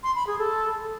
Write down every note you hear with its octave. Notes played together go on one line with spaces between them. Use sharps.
C6
B5
G#4
A4